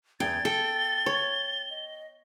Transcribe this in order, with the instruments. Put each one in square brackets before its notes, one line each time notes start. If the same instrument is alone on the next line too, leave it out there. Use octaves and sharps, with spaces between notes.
[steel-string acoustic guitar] E2 [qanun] G5 [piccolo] G#6 [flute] A6
[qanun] A4 [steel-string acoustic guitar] G5 [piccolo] G7
[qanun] C#5
[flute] D#5